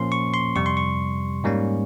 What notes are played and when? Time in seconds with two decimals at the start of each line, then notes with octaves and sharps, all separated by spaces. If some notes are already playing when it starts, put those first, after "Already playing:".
Already playing: A#2 F3 A#3 C#4 C6
0.12 C#6
0.34 C6
0.56 F2 C3 G3 C#6
0.66 C6
0.77 C#6
1.44 G#2 G3 A#3 C#4